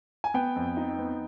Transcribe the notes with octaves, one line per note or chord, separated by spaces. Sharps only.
G#5
B3 G5
F2
D#4
B3